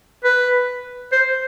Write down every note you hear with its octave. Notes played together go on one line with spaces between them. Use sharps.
B4
C5